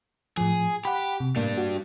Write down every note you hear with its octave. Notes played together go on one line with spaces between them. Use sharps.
A2 F3 G#4
G4 F#5 B5
C3
A2 G3 A#3 D4
F#4